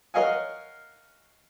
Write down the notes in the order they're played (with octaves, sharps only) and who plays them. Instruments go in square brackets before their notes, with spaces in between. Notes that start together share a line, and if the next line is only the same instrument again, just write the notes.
[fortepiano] A#4 C#5 D#5 F5 F#5 G#5